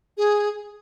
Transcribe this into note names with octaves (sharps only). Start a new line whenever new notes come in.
G#4